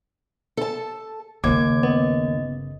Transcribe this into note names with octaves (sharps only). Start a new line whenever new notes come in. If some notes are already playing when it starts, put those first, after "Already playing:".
A4 A5
G1 D#2 C#3 D6 G#6
B3 D#5